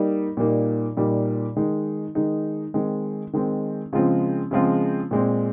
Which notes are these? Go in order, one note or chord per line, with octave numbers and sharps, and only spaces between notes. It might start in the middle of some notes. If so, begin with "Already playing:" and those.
Already playing: G3 A#3 D#4
A#2 G3 A#3 D#4
A#2 G3 A#3 D#4
D#3 G#3 D#4
D#3 G#3 D#4
D#3 G#3 C4
D#3 G#3 C4
C#3 F3 G#3 C4 F4
C#3 F3 G#3 C4 F4
A#2 G#3 C4